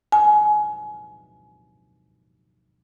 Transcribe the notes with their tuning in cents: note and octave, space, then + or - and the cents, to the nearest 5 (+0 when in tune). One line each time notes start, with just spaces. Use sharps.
G#5 +25